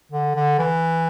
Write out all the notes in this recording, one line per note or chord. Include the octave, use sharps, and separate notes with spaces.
D3
D3
E3